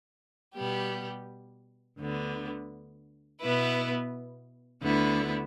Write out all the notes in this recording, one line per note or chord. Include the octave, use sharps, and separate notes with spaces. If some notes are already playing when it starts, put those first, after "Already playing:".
B2 G3 B3 G4
D2 D3 B3
B2 B3 E4 B4
D2 D3 B3 E4